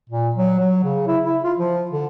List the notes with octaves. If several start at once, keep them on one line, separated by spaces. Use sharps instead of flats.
A#2
F#3
F#3
C#3
E4
E4
F4
F3
D3